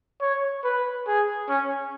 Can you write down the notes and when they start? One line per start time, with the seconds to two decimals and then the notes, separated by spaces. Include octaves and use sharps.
0.21 C#5
0.64 B4
1.07 G#4
1.49 C#4